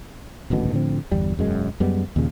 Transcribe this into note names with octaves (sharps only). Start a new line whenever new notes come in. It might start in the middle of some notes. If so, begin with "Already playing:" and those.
D#1 A1 D2 B2
A2 D3 F3 C4
G1 E2 G3
E1 F#2 G#3
F#2 G3 G#3 B3
D#2 A#2 C#3